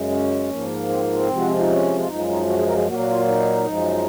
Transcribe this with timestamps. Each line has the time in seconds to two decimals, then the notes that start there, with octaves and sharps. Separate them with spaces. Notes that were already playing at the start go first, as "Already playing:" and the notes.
Already playing: F#2 C#3 G#3
0.10 C#4
0.50 G#2 F3 A#3
0.89 C4
1.12 C4
1.29 C3 F3 G#3
1.36 F#4
1.47 F4
1.58 D#4
1.69 C#4
1.99 F4
2.08 F#2 F3 G#3 D#4
2.28 D#4
2.48 F#4
2.57 G#4
2.67 A#4
2.77 G#4
2.87 A#2 F#3 A#3 F#4
2.99 F#4
3.07 F4
3.27 D#4
3.67 F#2 F3 G#3